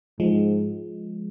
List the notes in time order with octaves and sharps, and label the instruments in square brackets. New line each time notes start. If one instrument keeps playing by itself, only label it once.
[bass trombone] G#2 [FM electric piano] F3 G#3